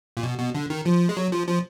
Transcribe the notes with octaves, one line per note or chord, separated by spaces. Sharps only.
A#2
B2
B2
D3
D#3
F3
G#3
F#3
F3
F3